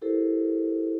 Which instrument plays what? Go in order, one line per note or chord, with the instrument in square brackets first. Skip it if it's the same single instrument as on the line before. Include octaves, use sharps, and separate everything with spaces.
[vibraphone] E4 G4 A4 A#4 C5